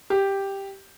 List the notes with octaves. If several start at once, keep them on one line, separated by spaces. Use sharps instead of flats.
G4